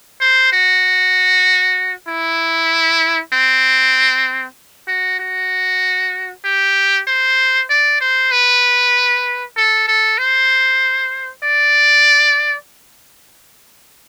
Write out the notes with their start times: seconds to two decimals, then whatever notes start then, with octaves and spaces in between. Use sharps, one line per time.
0.20 C5
0.52 F#4
2.08 E4
3.33 C4
4.88 F#4
5.19 F#4
6.45 G4
7.07 C5
7.70 D5
8.00 C5
8.31 B4
9.57 A4
9.88 A4
10.18 C5
11.44 D5